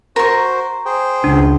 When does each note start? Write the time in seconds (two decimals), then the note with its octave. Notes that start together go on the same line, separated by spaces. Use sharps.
0.16 F#4 A#4 C5 C#6
0.86 G#4 C5 G5
1.24 C#2 D4